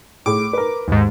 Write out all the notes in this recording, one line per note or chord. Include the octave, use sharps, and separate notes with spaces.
A2 G#4 D6
A#4 B4
D#2 G#2